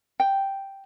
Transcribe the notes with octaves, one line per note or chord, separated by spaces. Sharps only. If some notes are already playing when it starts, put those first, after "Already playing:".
G5